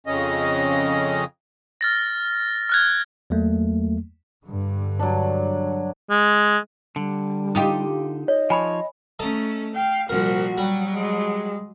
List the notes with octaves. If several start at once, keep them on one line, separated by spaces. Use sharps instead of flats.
F2 C#3 C#4 D#5
F6 A6 A#6
F6 F#6 G#6
E2 F#3 A3 A#3
G2 D3
F#3 D4
G#3
D3 G3
D#4 F4 G4 D#6
C#5 D#5
F3 C#5 G#5 B5
A3 C#4 A4 D#5 A#5
F5 G5
C2 A#2 F3 F#4 A#4
F#3 G3
G#3